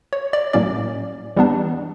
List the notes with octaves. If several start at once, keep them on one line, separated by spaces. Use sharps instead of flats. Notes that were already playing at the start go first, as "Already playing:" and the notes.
C#5
D5
A2 F#3 A#3 C#4 D5
E3 G3 B3 D4